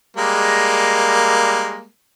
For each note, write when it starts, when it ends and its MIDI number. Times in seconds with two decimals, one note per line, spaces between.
0.17 1.86 55
0.17 1.86 56
0.17 1.86 58